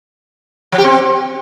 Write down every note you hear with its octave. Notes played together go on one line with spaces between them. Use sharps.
F3
G4
C4